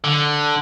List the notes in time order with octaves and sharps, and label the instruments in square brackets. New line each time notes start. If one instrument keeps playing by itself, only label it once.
[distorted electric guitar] D3